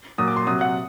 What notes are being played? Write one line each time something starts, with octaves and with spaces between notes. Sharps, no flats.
A#2 F#3 D#6
D6
C6
C3 F#3 D#6
F#5